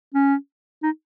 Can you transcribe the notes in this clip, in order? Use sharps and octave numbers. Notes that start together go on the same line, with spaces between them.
C#4
D#4